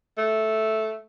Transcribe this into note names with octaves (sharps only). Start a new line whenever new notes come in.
A3